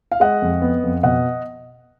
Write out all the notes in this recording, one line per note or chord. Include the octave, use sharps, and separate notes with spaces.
F5
G#3 D#5 F#5
F2
B3
F2
B2 D#5 F#5